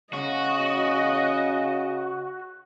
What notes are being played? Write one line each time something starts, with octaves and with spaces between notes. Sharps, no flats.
C#3 F#4 D#5